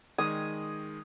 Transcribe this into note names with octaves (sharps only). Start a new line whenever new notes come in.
D#3 G#3 D#6 G#6